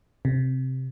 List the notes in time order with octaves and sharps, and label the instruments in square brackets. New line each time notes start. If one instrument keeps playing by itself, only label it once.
[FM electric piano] C3